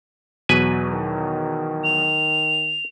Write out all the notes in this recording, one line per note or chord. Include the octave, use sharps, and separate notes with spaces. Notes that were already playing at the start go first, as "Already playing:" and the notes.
E2 B2 F#3 B4 G#5
D#3
F7